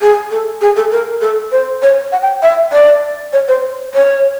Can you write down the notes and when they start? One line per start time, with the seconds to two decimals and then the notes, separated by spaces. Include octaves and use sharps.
0.01 G#4
0.31 A4
0.61 G#4
0.76 A4
0.92 A#4
1.21 A4
1.52 C5
1.82 C#5
2.12 F#5
2.22 G5
2.42 E5
2.72 D5
3.33 C#5
3.48 C5
3.94 C#5